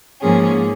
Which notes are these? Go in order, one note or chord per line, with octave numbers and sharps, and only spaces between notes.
G#2 F3 A#3 C#4 G#4